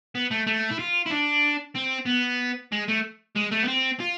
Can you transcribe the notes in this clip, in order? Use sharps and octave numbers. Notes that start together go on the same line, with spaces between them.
B3
A3
A3
E4
F4
E4
D4
C4
B3
G#3
A3
G#3
A3
B3
C4
F4